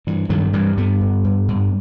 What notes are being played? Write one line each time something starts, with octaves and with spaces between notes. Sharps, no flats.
G2 E3
G2 D#3 F#3
G2 E3 G3
G2 G3 B3
G2
G2
G2